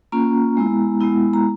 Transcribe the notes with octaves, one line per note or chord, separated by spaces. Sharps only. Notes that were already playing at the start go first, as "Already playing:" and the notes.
A#3 C#4 F4 A#5
G#3 B3 E4
G#3 B3 E4
A#5